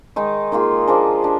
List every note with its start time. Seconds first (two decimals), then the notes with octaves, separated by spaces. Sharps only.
0.16 D#3 G#3 D#4
0.52 D#3 A#3 F4 G#4
0.87 F3 A#3 D4 G#4
1.22 D4 G4